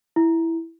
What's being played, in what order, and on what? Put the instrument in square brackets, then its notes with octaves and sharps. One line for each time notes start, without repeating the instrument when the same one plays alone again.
[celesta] E4